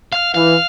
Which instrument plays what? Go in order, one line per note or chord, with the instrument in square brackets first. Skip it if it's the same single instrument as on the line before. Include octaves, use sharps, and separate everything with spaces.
[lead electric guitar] F5
[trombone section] E3 [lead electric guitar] F5